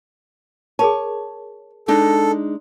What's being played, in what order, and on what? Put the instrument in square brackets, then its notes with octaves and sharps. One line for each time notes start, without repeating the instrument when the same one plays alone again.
[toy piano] G#4 A#4 A5 [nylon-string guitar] C#5
[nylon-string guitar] G#3 D4 D#4 [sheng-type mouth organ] A4